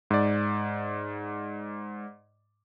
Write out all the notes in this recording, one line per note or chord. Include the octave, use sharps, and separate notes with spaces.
G#2 D5